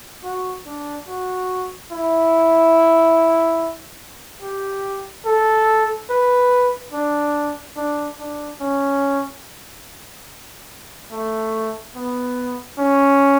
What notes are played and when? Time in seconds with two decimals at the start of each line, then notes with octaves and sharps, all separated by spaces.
0.24 F#4
0.66 D4
1.08 F#4
1.92 E4
4.42 G4
5.26 A4
6.10 B4
6.93 D4
7.77 D4
8.19 D4
8.61 C#4
11.12 A3
11.96 B3
12.79 C#4